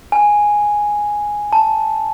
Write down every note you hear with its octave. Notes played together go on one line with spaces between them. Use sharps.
G#5
A5